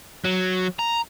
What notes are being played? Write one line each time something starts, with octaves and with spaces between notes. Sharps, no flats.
F#3
A#5